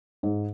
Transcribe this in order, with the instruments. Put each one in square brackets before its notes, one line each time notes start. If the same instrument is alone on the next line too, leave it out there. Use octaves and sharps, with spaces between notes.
[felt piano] G#2